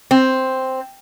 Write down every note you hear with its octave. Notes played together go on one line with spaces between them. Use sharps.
C4